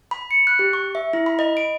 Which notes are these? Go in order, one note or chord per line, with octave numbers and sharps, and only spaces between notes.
B5
C#7
F#6
G4
C#6
E5
E4
B5
D#5
D7